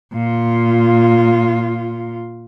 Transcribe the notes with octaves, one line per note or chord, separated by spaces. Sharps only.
A#2 F4